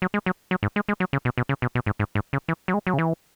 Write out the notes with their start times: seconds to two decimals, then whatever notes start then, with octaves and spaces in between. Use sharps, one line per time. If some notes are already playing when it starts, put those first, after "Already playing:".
0.02 F#3
0.14 G#3
0.26 F#3
0.51 F#3
0.63 G#2
0.76 G#3
0.89 G#3
1.00 F#3
1.13 C#3
1.25 B2
1.38 B2
1.49 C#3
1.62 B2
1.75 B2
1.86 G#2
1.99 G#2
2.15 G#2
2.33 C#3
2.48 E3
2.68 F#3
2.74 G#3
2.87 F#3
2.94 C#3
2.99 E3